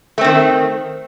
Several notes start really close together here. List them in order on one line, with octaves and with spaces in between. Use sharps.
A3 C4 D#3